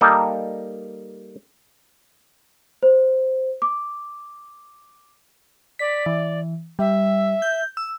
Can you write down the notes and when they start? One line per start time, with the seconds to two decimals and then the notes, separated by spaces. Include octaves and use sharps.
0.01 G3 A#3 D#4 A4 G5
2.83 C5
3.62 D6
5.79 D5 B6
6.06 E3
6.79 G3 E5
7.42 G6
7.77 E6